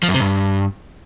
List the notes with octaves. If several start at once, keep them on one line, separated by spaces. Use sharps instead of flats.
F3
F#2
C3
G2